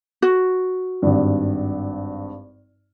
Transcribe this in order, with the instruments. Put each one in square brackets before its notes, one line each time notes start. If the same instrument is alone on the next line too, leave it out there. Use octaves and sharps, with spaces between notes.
[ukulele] F#4
[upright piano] G#1 G2